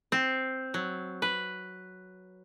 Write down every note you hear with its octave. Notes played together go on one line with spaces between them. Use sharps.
C4
F#3
B4